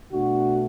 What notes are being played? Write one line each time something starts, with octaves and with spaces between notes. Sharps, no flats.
B2 A3 D4 F#4